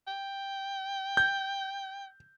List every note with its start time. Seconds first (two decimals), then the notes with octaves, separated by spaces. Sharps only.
0.07 G5
1.17 G6